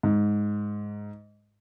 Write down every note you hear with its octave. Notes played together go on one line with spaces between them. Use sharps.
G#2